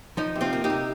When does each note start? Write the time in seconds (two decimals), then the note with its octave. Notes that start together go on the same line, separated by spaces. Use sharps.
0.17 F3 D#4
0.36 C3
0.41 C4 F4
0.53 A#3
0.64 D#4 G4
0.70 C3